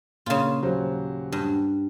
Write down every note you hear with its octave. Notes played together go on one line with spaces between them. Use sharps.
A#2 C#3 F4 F5
D#1 F#3 C5
G2